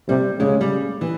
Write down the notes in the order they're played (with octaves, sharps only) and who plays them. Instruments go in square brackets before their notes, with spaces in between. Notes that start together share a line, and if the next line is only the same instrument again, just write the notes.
[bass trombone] C3 [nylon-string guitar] G3
[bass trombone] C#3 [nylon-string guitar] G#3
[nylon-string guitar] G3
E3